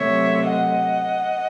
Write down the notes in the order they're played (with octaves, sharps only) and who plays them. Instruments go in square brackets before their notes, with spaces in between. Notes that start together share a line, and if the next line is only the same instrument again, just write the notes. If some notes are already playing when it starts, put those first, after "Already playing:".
Already playing: [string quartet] C3 F#3 A3 C#5 E5
D#5 F#5